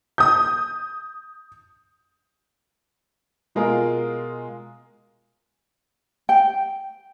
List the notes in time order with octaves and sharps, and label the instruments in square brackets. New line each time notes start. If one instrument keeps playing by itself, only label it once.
[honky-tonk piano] D#6 G6
[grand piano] B2 G#3 F4 G#4 A#4
[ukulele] G5